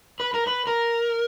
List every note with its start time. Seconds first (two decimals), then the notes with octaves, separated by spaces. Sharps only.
0.20 B4
0.34 A#4
0.47 B4
0.67 A#4